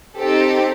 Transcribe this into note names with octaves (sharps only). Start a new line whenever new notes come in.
C4 D#4 G4 A4